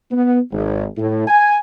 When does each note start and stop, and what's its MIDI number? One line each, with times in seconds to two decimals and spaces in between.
0.11 0.39 59
0.52 0.85 32
0.97 1.27 45
1.28 1.57 80